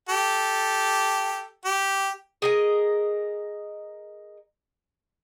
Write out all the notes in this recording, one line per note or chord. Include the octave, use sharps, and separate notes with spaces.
G4 A4
G4
G#4 A#4 D#5